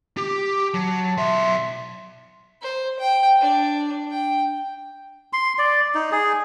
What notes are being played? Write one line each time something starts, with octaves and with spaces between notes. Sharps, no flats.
G4 D6
F#3 A5
B1 E5 C6
C5
G5
D4
G5
C6
D5
D#4
G#4